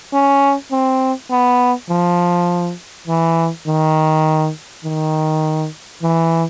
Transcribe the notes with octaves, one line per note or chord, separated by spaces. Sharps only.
C#4
C4
B3
F3
E3
D#3
D#3
E3